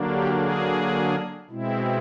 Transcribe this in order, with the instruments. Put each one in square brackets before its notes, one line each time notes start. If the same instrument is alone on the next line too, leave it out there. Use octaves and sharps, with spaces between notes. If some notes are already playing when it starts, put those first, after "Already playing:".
Already playing: [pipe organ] D3 F#3 A#3 D4
G4
G#4
B2 G#3 C4 E4